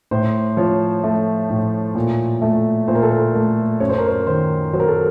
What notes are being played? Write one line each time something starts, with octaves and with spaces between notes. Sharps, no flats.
A2 C5
F3 C#5
A3
A2
A#2
A3
A#2 C5
A#4
A4
A#4
A3
F#2 C#5
C5
A#4
C5
D#3 C5
F#3 C5
A#4
A4